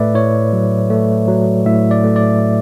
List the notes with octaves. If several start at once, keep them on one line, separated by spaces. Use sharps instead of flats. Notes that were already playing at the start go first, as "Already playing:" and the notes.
Already playing: A2 A3 B4 D5 E5
A2 C#5
F#3
A3
F#3
A2 E5
D5
A3
D5